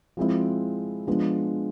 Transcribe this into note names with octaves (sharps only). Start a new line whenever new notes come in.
F3 G#3 C4 E4
F3 G#3 B3 D4